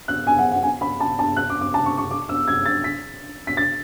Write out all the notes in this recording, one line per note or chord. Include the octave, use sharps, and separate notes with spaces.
F#6
G#5
F#5
F#5
G#5
B5
A5
A5
F#6
D6
D6
A5
C#6
C#6
D6
E6
G#6
A6
B6
B6
A6